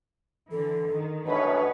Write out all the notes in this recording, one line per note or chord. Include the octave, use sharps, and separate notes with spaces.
D3 E3 A4
D#3
A1 F#2 B2 D4 B4 C#5